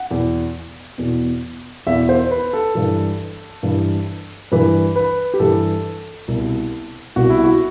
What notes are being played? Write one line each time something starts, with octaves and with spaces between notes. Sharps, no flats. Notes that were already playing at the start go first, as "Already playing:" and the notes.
Already playing: F#5
E2 B2
E2 B2
E2 B2 E5
C5
B4
A4
G2 E3
G2 E3
G2 E3 B4
B4
G4
G2 E3 A4
C2 B2
C2 B2 F#4
E4
F#4